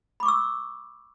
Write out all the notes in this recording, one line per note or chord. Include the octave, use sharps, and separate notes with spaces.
B5 C#6 D6 E6